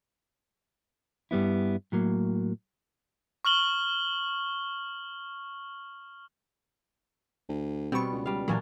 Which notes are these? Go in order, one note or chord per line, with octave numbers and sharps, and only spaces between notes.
G2 G3 B3 E4
A2 F#3 A#3
C#6 F6 F#7 G7
D2
B2 G3 B3 C4 C#6
C#2
G3 F5
A#2 E3 F#3 A#3 C#4 D4